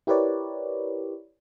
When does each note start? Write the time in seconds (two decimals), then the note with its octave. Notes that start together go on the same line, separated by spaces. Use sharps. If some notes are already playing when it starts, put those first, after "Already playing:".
0.07 E4 G4 A#4 B4 C#5 D5